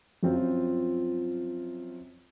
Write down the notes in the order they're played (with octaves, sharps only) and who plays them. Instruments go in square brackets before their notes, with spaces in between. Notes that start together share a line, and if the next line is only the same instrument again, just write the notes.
[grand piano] F#2 F3 C4 F4